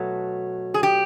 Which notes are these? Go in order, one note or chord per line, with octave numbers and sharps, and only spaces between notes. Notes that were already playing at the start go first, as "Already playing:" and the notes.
Already playing: B2 F#3 A3
G#4
G4